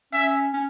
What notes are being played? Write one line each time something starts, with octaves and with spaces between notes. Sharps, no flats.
C#4 E5
C#4